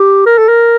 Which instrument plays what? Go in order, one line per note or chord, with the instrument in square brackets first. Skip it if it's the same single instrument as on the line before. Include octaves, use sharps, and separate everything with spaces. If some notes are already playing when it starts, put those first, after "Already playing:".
Already playing: [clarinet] G4
A#4
A4
A#4